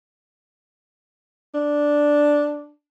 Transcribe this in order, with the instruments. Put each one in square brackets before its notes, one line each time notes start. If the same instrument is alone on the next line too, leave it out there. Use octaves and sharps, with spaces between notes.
[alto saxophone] D4